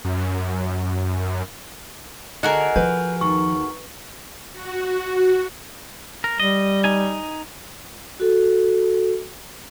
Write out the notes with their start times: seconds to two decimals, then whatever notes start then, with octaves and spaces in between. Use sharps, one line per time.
0.05 F#2
2.43 D3 F#4 G#4 A#4 D#5 A#5
2.76 F3 B4 G6
3.21 D#2 C#6
4.52 F#4
6.24 A#4
6.40 G3 D#5
6.84 D#4 G#5
8.20 F#4 A4